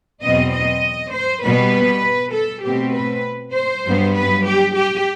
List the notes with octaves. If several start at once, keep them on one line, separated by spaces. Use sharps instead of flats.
E2 B2 F#3 C4 D#5
D#5
C5
B2 G3 B3 B4
A4
B2 A3 C4 G4
B4
C5
G2 F#3 B3
B4
G4
G4